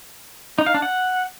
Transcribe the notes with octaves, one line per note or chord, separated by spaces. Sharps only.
D#4
F5
D4
F#5